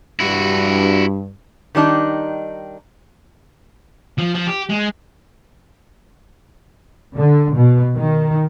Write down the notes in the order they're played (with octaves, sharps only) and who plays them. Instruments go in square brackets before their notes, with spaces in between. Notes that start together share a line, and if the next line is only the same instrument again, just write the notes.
[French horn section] G2 [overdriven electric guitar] E4 F#4
[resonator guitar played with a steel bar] D#3 G3 D4 D#4
[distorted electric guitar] F3
F3
G4
G#3
[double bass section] D3
B2
D#3